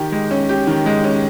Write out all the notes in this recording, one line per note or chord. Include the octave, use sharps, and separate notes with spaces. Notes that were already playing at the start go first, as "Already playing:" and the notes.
Already playing: D#3 G4
G#3
C#4
G4
D#3
G#3
C#4